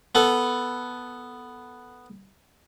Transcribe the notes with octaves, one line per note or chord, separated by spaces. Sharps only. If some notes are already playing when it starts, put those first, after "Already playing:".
B3 A4 B4